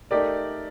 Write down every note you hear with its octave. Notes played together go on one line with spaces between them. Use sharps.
A3 D#4 G4 A#4 D5